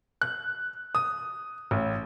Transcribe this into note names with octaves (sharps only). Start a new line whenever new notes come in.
F#6
D#6
A1